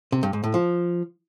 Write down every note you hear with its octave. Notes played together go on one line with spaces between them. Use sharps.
C3
G2
G#2
A2
F3